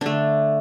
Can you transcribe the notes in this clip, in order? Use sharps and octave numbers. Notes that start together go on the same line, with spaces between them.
D3 A3 D4